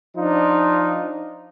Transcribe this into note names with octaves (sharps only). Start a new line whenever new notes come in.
F3 D4 D#4 F4